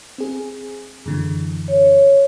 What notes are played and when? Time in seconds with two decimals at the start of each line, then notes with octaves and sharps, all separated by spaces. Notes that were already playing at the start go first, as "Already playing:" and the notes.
0.18 C4 G#4
1.06 F#2 D3 E3
1.68 C#5